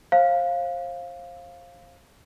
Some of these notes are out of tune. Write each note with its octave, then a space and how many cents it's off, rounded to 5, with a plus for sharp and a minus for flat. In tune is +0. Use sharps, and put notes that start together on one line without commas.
C5 +35 F5 +0